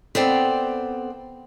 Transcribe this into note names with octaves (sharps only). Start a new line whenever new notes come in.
B3 C4 A4 D5 G5